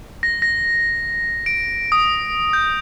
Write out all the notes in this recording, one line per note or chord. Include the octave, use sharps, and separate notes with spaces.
A#6
A#6
D7
D#6
G6